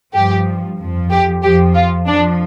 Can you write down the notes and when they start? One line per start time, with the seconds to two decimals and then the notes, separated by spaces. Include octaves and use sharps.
0.14 G2 F3 G4
0.79 F2 F3
1.11 G4
1.42 F2 F3 G4
1.74 F4
2.07 F2 F3 D4